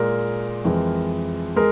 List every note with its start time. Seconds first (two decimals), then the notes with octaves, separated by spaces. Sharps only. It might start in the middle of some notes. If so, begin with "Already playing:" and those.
Already playing: A#2 G#3 A#4
0.64 F2 E3 G#3
1.56 G#3 A#4